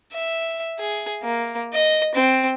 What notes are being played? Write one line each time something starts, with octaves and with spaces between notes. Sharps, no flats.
E5
G#4
A#3
D#5
C4